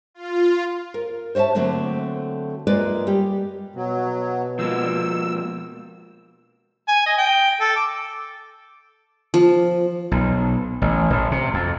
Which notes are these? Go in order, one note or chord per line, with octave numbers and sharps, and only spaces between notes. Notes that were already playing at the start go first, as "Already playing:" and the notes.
F4
A#4
C5 C#5 D#5 E5 A5
D3 F#3 A3 A#3 C4 D4
F#2 G#3 A#3 F4 B4 D5
G3 G4
B2 F#3
F3 G#3 A#3 E6
G#5
D#5
G5
A4
D6
F3
B1
A1
A1
C3
F2